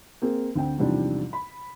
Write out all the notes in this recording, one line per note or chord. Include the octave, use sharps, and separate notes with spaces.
A#3 C4 G#4
D2 C4 G5
E2 G#2 C3 F3 G3 D4
B5